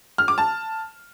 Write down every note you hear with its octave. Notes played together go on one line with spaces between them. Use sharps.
F6
D6
A5